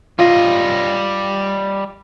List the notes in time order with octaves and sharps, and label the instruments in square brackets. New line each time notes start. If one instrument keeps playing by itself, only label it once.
[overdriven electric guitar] G3 D#5 [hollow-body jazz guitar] F4